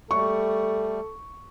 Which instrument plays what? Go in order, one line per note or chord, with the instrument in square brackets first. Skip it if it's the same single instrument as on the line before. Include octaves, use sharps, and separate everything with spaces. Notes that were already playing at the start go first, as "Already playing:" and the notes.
[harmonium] G3 A3 [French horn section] A4 [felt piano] C#6